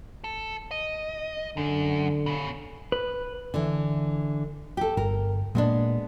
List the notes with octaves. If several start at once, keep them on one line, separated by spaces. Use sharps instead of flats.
A4
D#5
F#2 D3
B2 C#4
B4
D3 E3
G4 A4
G1 A#4
A#2 G#3 B3 D4